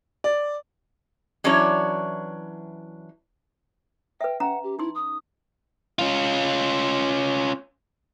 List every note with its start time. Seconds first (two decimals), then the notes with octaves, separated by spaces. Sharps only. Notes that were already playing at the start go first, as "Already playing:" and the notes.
0.24 D5
1.44 E3 F#3 C#4 D4 E4 C#5
4.21 B4 E5 G5
4.40 C#4 F#5 A#5
4.64 G4
4.79 D#4 E4 C6
4.95 D#6
5.99 C#4 F4